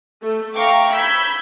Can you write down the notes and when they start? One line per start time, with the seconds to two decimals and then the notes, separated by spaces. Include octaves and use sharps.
0.23 A3
0.56 E5 F5 G5 A#5 C#6 D6
0.94 B5 E6 G6 G#6 B6